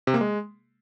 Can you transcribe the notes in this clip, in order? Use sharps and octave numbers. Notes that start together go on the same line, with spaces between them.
C3
A#3
G#3